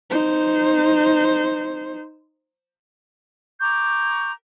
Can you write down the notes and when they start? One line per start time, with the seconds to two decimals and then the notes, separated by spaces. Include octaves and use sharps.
0.11 D#4 C5
3.60 A#5 C#6 D6 G6